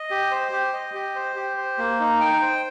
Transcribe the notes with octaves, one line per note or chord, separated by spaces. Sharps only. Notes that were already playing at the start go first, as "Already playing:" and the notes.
Already playing: D#5
G4
C5
G4
D#5
G4
C5
G4
C5
A#3
D#4
G5
C5